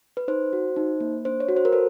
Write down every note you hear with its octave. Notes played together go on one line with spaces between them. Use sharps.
B4
D#4 C5
F#4
D#4
A#3
D4 C5
C#5
F#4
C5
A#4
A4 B4